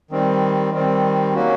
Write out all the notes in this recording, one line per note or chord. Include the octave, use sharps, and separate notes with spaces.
D#3 G3 C4
D#3 G3 C4
F#3 A#3 C#4 F#4